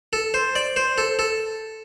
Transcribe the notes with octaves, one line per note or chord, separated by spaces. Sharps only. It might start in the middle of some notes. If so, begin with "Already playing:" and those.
A4
C5
D5
C5
A4
A4